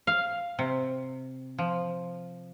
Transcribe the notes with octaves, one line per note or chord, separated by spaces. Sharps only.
F5
C3
F3